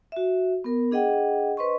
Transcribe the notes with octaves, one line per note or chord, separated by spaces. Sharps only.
F#4 E5
B3 A#4
D4 G#4 D#5 F#5 G5
D4 B4 C5 D#5 C6 C#6